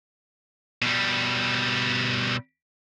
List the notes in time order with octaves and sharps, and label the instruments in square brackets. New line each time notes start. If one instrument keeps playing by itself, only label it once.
[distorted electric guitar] B2 G3